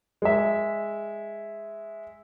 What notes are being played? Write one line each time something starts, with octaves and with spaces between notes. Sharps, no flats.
G#3 E5